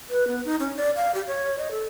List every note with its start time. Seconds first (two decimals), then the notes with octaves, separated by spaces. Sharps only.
0.10 B4
0.28 B3
0.45 D#4
0.60 C#4
0.77 D5
0.96 F5
1.14 G4
1.27 C#5
1.58 D#5
1.71 A4